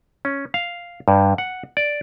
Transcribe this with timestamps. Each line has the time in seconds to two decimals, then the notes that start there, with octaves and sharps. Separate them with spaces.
0.25 C#4
0.54 F5
1.08 G2
1.38 F#5
1.77 D5